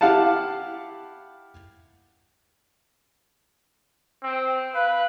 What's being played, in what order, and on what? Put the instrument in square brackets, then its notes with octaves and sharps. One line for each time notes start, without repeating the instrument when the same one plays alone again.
[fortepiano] E4 G4 F5 F#5 A5
[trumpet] C4
[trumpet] B4 [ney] F5